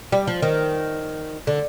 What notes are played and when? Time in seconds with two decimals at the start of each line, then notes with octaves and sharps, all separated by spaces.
0.12 G3
0.27 F3
0.42 D#3
1.47 D3